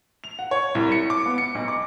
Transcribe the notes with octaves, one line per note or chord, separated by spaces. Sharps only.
F7
F#5
C#5
C2
C#7
D6
B3
C#7
B1
D6